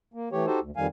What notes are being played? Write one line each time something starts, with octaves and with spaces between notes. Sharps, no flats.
A#3
E3 A3 G4 C#5
D#4 F#4 G4 A4 C5
D2
F2 D#3 G3 F5 G#5